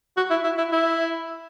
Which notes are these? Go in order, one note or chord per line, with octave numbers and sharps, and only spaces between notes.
F#4
E4
E4
E4
E4